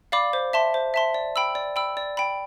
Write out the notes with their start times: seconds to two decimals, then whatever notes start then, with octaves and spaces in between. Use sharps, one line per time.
0.12 D5 F5 B5 D6
0.33 C5
0.53 E5 A5 C6
0.74 C5
0.94 E5 A5 C6
1.14 D5
1.36 G5 B5 E6
1.55 D5
1.76 G5 B5 E6
1.97 D5
2.17 G5 B5